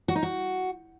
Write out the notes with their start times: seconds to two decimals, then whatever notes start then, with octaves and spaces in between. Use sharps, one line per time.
0.08 F#4
0.15 D#4
0.23 F#4